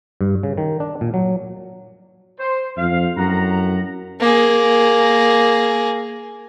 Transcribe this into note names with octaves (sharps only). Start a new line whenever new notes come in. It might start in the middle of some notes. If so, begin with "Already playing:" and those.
G2
C#3
D#3
D4
A#2
F#3
C5
F2 F5
F#2 A2 F#5 A#5
A#3 G#4